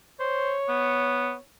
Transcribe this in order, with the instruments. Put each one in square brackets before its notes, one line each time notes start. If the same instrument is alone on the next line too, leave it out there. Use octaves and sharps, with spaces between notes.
[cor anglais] C5 [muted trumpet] C#5
[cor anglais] B3